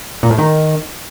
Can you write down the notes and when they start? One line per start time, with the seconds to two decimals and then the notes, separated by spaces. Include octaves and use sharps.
0.23 A#2
0.31 A2
0.38 D#3